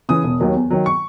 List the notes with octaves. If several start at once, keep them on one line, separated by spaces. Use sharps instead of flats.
C#3 E3 D#6
E1
D#2 D#3 F#3
E2
D#3 F#3
C#6